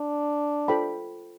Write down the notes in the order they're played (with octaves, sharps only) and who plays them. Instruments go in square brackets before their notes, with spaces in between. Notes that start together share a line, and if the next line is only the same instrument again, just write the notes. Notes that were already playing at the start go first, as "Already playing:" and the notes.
Already playing: [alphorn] D4
[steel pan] F4 A4 C5 G5 B5